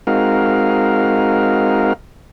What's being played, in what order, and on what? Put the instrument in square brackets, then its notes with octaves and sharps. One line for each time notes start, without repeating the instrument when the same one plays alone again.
[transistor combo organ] G#3 C4 D#4 F#4 A#4 F5